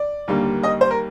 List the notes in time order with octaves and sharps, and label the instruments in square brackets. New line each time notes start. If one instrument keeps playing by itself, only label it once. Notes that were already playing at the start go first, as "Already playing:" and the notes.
Already playing: [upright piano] D5
D#2 D3 G3 A#3
D#5
C5
A#4